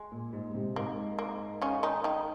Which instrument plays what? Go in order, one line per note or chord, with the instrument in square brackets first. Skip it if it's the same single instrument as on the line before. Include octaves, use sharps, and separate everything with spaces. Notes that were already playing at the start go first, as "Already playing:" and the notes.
Already playing: [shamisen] G#3
[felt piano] A#2
G#2
C3
[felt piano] G#2 [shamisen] A#3
[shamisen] A#3
C#3 C#4
D#3 D#4
D#3 D#4